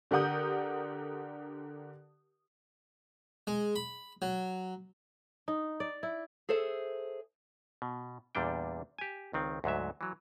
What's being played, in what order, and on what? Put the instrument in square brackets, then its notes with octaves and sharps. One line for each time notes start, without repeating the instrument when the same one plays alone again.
[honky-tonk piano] D3 G4 A#4 F#5 D#6 G6
[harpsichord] G#3
B5
F#3
[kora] D#4
D5
E4
[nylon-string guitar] G#4 A4 C5 E5
[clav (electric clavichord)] B2
E2 A#2 G3 D4 G5
G4 G#5
C#2 D#3 C4
D2 G#2 F#3 E5
E3 F#3